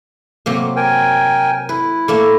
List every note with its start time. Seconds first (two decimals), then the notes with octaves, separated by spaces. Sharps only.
0.46 C3 F#3 A#3
0.76 A#4 G5 G#5
1.69 E4 B4
2.08 A3 A#3 E5